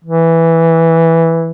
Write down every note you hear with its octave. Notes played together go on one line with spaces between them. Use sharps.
E3